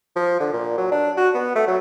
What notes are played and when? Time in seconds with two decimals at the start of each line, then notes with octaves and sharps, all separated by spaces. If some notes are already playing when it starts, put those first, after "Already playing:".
0.16 F3
0.40 D3
0.53 A#2
0.78 F#3
0.92 D4
1.17 F#4
1.34 B3
1.55 A3
1.67 F#3